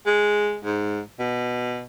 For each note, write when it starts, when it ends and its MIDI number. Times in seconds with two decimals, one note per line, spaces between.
0.06 0.58 56
0.64 1.00 44
1.19 1.84 47